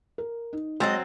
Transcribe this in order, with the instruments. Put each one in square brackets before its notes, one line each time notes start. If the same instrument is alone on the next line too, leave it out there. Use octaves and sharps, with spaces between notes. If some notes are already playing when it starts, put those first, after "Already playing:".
[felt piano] A#4
D#4
[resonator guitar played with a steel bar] F#3 C4 [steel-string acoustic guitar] G#3 D#5 [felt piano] C6 E6 A6